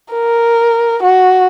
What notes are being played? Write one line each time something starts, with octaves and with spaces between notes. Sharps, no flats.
A#4
F#4